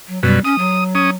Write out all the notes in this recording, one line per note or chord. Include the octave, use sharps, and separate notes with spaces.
F#3
F#2 B2 G3
C#4 D#6
F#3
C#4 D#6